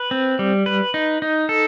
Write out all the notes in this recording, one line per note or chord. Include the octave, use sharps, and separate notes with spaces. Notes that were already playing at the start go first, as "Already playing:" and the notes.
Already playing: B4
C4
G3
B4
D#4
D#4
A4